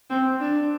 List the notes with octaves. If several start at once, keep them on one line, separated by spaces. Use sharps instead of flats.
C4
D4